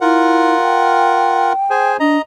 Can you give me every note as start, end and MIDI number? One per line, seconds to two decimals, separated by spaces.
0.01 0.56 64
0.01 1.53 65
0.01 1.53 70
0.01 1.53 78
0.61 1.92 79
1.70 1.97 68
1.70 1.97 72
1.70 1.97 80
2.00 2.18 62
2.00 2.22 75
2.00 2.22 82